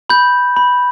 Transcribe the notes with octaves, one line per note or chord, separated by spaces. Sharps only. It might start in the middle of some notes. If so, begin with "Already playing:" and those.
B5 G6
B5